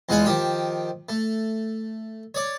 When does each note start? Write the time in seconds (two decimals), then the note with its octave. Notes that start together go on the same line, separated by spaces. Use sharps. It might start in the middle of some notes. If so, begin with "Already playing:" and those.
0.09 E2 G#3 F4 F#5 G#5
0.25 D#3 F3 G4 G5
1.09 A3
2.35 C#5 D5